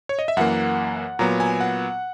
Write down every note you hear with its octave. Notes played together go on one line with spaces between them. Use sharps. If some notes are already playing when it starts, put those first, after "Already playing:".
C#5
D#5
E5
F#2 E3 A#3 F#5
A#2 F#3 B3 A#5
G#5
F#5